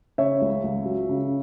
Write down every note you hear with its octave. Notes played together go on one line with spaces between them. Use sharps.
C#3 C#5 E5
C#2
C#2
F#3
C#3